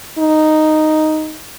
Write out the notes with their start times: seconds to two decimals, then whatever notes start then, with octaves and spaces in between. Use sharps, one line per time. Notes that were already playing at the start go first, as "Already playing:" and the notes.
0.18 D#4